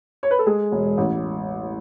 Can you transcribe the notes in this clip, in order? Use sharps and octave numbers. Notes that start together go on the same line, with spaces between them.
C#5
B4
A4
G#3 G#4
E1
A1